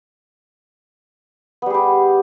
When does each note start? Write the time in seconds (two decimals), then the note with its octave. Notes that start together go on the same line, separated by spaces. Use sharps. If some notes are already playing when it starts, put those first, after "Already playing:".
1.62 B3
1.66 G3
1.70 G#4
1.74 G4